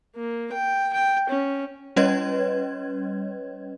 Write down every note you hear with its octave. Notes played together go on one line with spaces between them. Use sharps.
A#3
G5
G5
C#4
G3 C#4 B4 C#5 D#5 G#6